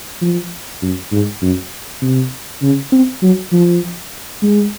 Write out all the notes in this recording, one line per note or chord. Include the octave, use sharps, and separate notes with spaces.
F3
F#2
G#2
F#2
C3
C#3
C4
F#3
F3
G#3